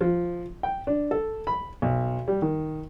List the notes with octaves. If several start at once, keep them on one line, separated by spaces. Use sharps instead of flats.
F3
G5
D4
A4
B5
B1
G3
D#3